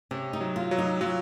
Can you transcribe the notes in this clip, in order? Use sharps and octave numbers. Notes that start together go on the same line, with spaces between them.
C3 C#4
D#4
F#3
F4
F#3
D#4
F#3 F4